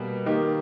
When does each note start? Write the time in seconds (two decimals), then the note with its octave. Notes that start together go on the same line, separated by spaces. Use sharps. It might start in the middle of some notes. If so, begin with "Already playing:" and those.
Already playing: B2 G3 A#3
0.26 D#3 A#3 D#4 G4